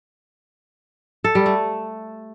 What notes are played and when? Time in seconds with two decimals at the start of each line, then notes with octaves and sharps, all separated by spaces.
1.24 A4
1.35 G3
1.46 A3